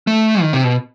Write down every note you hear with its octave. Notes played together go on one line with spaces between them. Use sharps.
A3
D#3
C3
B2